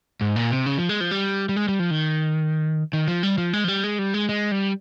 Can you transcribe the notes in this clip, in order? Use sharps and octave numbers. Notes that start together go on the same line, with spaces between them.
G#2
A#2
C3
C#3
F3
G#3
F3
G3
G3
G#3
G3
F3
D#3
D#3
F3
G3
F3
G#3
F3
G3
G#3
G3
G#3
G#3
G3